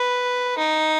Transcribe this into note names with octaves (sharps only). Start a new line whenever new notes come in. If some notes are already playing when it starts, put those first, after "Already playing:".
Already playing: B4
D#4